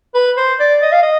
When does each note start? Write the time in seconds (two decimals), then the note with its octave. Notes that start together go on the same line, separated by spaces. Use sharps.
0.15 B4
0.37 C5
0.59 D5
0.82 D#5
0.92 F5
1.03 D#5